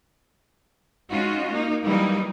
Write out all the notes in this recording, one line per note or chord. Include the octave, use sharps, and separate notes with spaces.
G#3 C#4 D#4 F4 F#4
A#3 D#4
E3 F#3 G3 A#3 D#4